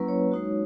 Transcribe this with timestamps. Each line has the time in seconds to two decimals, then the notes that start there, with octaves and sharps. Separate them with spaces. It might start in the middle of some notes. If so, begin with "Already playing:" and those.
Already playing: F#3 A#3 C#4 E4 B4
0.08 C#5
0.32 G#3 D#4 F#4